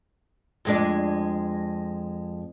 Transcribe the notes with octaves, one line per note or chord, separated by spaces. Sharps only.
F2 G#3 D4